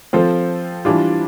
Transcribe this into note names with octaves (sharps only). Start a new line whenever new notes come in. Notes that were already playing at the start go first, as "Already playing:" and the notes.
F3 C4 F4 A4 C5
E3 G3 D4 F4